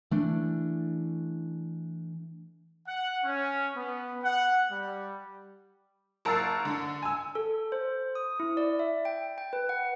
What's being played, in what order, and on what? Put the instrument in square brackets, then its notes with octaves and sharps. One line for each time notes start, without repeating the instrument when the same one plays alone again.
[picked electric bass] E3 A3 D4
[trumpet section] F#5
C#4
B3
F#5
G3
[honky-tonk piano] F#1 A#4 A5 E6 A6 C7
D3
G#5 E6
[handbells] A4
C5
D#6
E4
D5
E5
G5
G5
B4
F#5